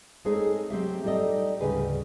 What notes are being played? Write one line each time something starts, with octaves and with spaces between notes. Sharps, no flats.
G#3 A3 C4 D#4 G#4 C#5
F#3 C4 G4 E5
G3 D#4 G4 A4 D5 D#5
D2 G#2 C#3 G3 G#4 B4